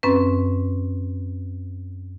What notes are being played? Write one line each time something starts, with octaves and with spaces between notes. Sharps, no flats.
F#2 C4 C#4 B4